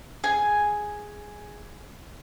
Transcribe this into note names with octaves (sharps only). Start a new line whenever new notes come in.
G#4 G#5